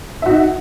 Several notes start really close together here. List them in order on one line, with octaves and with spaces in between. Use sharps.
E5 F#4 D#4